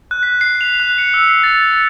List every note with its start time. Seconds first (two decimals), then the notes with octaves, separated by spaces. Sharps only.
0.11 F#6
0.23 B6
0.41 C7
0.61 F7
0.80 F#6
0.98 C#7
1.14 E6
1.29 C7
1.43 A6
1.71 C#7